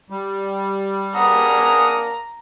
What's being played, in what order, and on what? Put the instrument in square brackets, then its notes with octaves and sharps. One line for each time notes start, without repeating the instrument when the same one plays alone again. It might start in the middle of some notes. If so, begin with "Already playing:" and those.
[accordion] G3
[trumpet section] A#3 D4 G#4 [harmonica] F#5 D#6 [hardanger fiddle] A#5